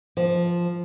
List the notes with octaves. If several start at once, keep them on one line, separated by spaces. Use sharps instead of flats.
F3